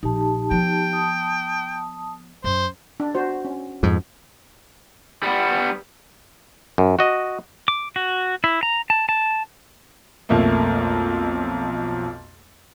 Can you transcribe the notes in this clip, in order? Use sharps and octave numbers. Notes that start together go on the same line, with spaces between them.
A#1 D#4 G4 A5
F3 B3 G5
A5 D#6
F#2 C5
D4
F#4 C5
C#4
F2 G#2
G3 B3
F#2
F#4 D#5
D6
F#4
E4
A#5
A5
A5
B1 F2 A3 A#3